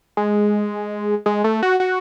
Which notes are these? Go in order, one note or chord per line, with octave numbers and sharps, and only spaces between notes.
G#3
G#3
A3
F#4
F#4